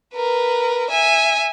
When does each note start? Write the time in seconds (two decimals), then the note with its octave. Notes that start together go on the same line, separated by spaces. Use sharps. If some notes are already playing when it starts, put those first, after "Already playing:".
0.14 A#4 B4
0.91 E5 G#5